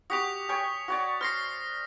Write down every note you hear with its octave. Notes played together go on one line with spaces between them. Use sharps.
F#4 G4 D6 D#6 B6 F7
C#5 G5 G#5
F#4 C#5 D5
C5 F6 A#6 C7